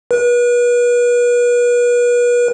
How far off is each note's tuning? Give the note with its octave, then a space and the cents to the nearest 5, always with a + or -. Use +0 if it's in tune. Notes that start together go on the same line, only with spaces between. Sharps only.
B4 -35